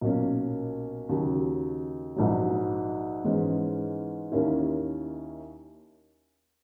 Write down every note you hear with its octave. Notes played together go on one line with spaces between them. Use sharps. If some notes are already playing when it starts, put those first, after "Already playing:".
B1 A#2 A#3 C#4
D#2 C#3 F#3
A#1 G#2 F#3
G#2 E3 G#3 C#4
D#2 D#3 A#3 C#4 E4